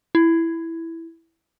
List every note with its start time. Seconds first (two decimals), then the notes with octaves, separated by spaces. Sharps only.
0.15 E4